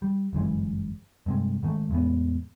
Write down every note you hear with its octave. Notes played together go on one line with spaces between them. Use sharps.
G3
G1 F#2 E3 G#3
G2 C3 G#3
G#2 D#3 G#3 A3
E2 A2 G#3 B3